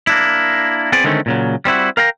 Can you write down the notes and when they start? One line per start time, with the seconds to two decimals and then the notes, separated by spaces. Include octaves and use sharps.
0.07 A#3 D4 E4
0.92 B3 C4 G#4 D5
1.04 D3 D#3 G#3 A3 C4 C#4
1.26 A#2 C#3 F#3
1.65 G3 C4 E4 F#4
1.97 A#4 F5 G5 A#5